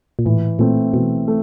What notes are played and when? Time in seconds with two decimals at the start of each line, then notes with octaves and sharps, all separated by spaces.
0.19 A#2
0.25 A2 E3
0.59 A#2 A3 C4
0.93 B2 E3
1.28 A3